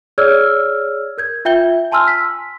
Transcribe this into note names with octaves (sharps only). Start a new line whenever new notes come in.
G#4 C#5 D5 E6 F6 G#6
A#4 G6 G#6
F4 E5 G5 G6 G7
G#5 A5 C6 E6 F6
B6